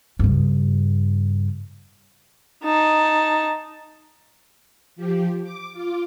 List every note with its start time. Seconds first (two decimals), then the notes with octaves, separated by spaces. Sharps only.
0.19 G2 C#3
2.64 D#4 A5
4.96 F3 G4
5.43 D6
5.73 F4 D6